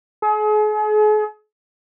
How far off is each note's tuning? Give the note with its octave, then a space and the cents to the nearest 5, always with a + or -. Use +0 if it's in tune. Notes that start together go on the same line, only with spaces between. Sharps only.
G#4 +40